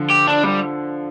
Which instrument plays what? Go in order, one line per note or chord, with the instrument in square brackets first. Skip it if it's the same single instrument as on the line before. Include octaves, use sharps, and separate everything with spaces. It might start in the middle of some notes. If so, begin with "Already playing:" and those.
Already playing: [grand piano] D3 F3
[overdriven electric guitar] G4
D4
G3